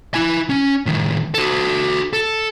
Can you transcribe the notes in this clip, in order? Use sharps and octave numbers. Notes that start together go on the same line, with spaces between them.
E4 G#5
C#4
A2 D#3
F#4 A4
A4